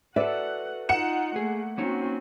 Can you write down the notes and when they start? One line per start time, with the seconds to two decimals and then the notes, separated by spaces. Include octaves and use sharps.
0.16 F#4 A4 B4 D5 E5 F#5
0.89 D#4 F4 F#5 C#7 E7
1.36 A3 A#3 G#4
1.78 A#3 C4 C#4 D#4 F#4